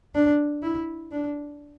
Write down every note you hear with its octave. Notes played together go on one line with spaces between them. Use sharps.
D4
E4
D4